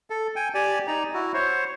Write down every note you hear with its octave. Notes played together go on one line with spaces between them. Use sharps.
A4
G5 G#5
G4 D5 G#5
D#4 D5 A#5
E4 F#4
C5 C#5